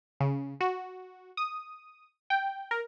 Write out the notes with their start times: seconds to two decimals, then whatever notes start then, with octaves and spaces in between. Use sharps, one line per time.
0.20 C#3
0.61 F#4
1.37 D#6
2.30 G5
2.71 A#4